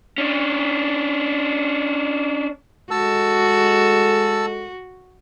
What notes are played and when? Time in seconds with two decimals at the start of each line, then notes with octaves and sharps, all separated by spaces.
0.18 C#4 D4
2.91 G#3 F#4 A4 A5 E6